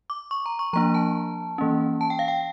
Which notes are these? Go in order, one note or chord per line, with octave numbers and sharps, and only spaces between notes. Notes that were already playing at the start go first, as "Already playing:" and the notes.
D6
C#6
A#5
C#6
F3 A#3 D4 A#5
A5
E3 A#3 C#4
A5
G5
F5
G5